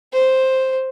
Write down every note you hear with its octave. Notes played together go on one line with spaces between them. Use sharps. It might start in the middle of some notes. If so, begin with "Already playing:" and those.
C5